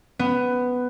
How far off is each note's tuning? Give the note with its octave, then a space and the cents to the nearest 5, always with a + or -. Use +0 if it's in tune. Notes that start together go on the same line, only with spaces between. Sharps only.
B3 +10